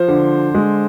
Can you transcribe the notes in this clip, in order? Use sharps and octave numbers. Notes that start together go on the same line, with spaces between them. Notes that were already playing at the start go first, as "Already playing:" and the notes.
Already playing: F3 C5
D3
G#3